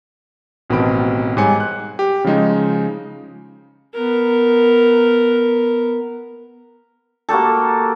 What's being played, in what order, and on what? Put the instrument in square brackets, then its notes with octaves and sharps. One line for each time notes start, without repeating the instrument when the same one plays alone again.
[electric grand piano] A1 B2 D#3 C4 B5 D7
G#2 G3 C#5 G#5 C#7
F#6
G4
C#3 F3 G#3 D#4
[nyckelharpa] B3 A#4
[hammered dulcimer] A#3 F#4 G4 A4